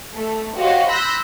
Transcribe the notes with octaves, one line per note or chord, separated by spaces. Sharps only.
A3
F#4 G4 C5 C#5 D#5 F5
B5 C6 E6 F#6 G6 A#6